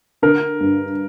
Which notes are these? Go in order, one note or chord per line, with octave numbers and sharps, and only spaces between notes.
D3 A#4
G2